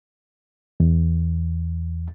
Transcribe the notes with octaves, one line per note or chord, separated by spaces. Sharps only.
E2